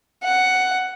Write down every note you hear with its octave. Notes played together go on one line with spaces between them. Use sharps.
F#5